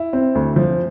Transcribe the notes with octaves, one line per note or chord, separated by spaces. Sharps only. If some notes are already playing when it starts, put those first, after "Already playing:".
Already playing: E4
C4
D2
F3